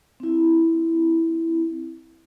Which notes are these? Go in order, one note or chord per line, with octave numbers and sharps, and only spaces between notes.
C4 E4